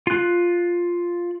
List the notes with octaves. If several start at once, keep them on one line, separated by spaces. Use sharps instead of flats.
F4 F#6